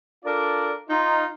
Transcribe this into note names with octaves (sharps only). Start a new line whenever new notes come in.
D4 F4 A4 A#4 D5
D#4 F4